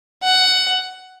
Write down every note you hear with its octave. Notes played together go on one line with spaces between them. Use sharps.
F#5